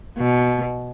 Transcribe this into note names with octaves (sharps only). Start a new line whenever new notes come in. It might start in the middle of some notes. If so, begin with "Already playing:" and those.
B2